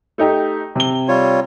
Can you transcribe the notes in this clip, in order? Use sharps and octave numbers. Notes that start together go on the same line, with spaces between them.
A3 D#4 G4
C3 G7
G3 F4 C#5